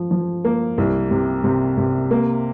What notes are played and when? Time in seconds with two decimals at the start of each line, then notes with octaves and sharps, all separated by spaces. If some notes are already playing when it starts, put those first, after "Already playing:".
Already playing: F3
0.11 F3
0.44 A#3
0.78 C2
1.11 C3
1.44 C3
1.77 C3
2.11 A#3